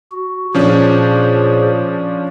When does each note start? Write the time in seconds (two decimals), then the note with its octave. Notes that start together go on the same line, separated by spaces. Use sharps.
0.12 F#4
0.55 A#2 F3 C#4 D4 G#4 C5